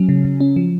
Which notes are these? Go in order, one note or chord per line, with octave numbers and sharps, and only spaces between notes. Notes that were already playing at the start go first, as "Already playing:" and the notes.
Already playing: F#3 C#4
C#3
C#3
C#4
F3